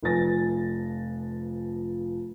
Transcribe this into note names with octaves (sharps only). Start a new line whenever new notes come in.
F1 F3 B4 G#5 A6 A#6